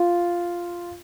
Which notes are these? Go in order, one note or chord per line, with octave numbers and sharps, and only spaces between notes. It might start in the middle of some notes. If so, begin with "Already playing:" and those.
Already playing: F4